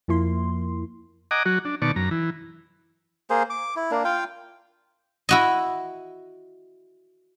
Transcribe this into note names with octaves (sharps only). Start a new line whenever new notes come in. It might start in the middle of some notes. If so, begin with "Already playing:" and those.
F2 F3 A#3 E4 C6
D#5 F#5 G#5 A#5 D6
F#3 F#4
D4
B2 D#3 D5 A5 C#6
F#2 A#5
E3
A#3 G#4 C5
D6
E4
A#3 D4
F4 F5 G5
E4 F#4 D#5